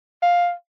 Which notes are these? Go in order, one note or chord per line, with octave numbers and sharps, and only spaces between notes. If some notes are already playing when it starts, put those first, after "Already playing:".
F5